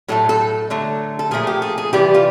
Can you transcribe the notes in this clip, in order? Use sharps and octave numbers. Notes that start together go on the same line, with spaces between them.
A2 F#3 A3 A4
A4
D3 F#3 A3
A4
A#2 F3 A3 G#4
G4
G#4
G#4
C3 E3 G3 G4
F4